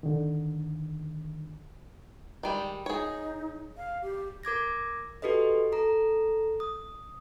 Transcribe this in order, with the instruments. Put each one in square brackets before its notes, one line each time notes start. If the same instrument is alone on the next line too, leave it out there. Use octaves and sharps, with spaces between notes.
[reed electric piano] D3 D#3
[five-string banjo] D#3 G3 G#3
[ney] D#4 [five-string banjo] G#4 C#5
[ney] F5
G4
[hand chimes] A#4 D6 G#6 A#6
F#4 G4 A4 B4 D#5
A4 A#5
D#6